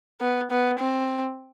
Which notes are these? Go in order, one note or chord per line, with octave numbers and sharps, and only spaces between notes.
B3
B3
C4